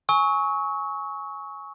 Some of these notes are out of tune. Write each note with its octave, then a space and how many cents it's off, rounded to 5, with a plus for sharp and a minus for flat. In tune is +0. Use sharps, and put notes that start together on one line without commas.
G#5 +10 C#6 +0 E6 -45